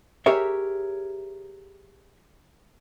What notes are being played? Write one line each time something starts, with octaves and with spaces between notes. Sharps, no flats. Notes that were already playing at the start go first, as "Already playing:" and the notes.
G4 G#4 A#4 C#5 E5